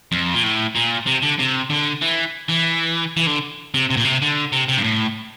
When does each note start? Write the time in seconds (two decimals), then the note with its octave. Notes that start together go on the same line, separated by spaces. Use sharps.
0.12 F2
0.34 A#2
0.43 A2
0.75 A#2
1.06 C3
1.22 D3
1.39 C3
1.70 D3
2.02 E3
2.49 E3
3.17 E3
3.27 D3
3.74 C3
3.90 C3
3.97 A#2
4.04 C3
4.22 D3
4.52 C3
4.68 C3
4.78 G2
4.84 A2